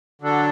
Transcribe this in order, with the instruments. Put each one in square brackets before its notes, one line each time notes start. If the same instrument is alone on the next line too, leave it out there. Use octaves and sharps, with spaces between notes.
[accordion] D3 F#3 D4 A4